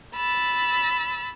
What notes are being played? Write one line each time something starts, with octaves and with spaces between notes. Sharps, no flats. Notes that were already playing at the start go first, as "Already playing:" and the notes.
B5 E6 A6